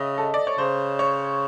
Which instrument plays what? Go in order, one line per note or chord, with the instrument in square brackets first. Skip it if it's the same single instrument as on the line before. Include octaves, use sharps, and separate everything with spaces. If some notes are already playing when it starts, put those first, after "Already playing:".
Already playing: [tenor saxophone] C#3 [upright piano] D#5 E5
[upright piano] A4
D5
C#5
[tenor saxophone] C#3 [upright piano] C5
[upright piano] C#5